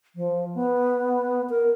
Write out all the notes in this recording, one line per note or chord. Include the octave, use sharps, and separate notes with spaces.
F3
B3
A#4